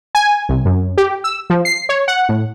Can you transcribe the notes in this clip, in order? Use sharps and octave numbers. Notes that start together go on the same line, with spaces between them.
G#5
C2
F#2
G4
E6
F3
C7
C#5
F#5
A2